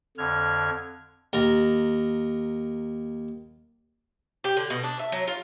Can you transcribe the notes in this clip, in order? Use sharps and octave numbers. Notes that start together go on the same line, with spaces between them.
F2 D3 F6 G#6
D#2 A#4
G4
D3
B2
D4
E5
F#3
F4